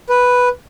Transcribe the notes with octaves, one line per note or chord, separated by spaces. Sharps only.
B4